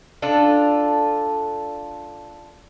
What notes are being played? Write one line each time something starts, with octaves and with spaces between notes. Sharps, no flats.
D4 F4 A4